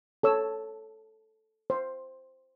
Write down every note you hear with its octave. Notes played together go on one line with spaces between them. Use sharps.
A4 C#5 E6
C5